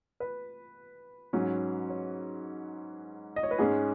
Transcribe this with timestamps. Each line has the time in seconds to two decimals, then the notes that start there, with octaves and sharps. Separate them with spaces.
0.20 B4
1.33 G#2 F#3 C#4
1.90 C#5
3.36 D#5
3.43 C#5
3.51 B4
3.58 G#2 G#3 C#4 G#4